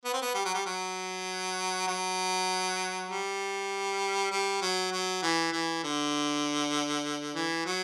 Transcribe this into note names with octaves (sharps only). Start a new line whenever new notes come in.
B3
C4
B3
G3
F#3
G3
F#3
F#3
G3
G3
F#3
F#3
E3
E3
D3
E3
F#3